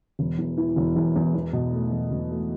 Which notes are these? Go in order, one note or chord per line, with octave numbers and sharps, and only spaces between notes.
E1
E2
E3
E1
E2
E2
E2
B2
A3
E2
E1
A3